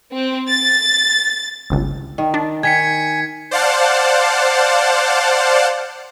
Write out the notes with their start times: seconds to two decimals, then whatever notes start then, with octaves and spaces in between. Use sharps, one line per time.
0.12 C4
0.47 A6
1.70 G1 C#2
2.18 D#3
2.34 D4
2.63 D#3 G#5 G#6 B6 C#7
3.51 C5 D5 F5 F#5 A5